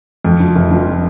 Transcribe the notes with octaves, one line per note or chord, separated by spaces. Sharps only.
F2
F3
F1
F3